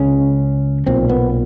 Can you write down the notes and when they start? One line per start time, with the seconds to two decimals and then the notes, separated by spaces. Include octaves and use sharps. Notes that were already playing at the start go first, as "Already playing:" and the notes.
Already playing: C#2 C#3 C#4
0.86 B1 A#2 C4
1.09 B3